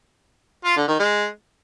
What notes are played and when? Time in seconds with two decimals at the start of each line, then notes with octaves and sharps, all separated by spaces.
0.65 F4
0.77 D3
0.88 D#3
1.00 G#3